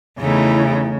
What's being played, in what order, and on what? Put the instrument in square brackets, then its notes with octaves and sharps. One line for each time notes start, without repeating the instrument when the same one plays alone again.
[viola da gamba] E2 A3 D#4 [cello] C#3 [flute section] E4